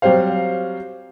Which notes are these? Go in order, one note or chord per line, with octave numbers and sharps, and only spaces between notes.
F#3 G3 C4 C5 F5